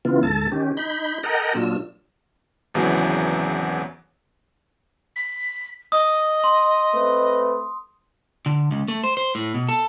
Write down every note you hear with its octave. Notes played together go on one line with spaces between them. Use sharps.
C#3 E3 B3 F4
D2 G#2 A4 A5
D#3 C#4 G4
D#4 B5 G6
A4 A#4 D#5 F#5 G5 A#5
A#2 F#3 D4 F4 E6
G#1 E2 C#3 E3 F#3
B6
D#5 D#6
C6
A3 C4 B4
D3
C#2
A3
C5
C5
A2
B2
A4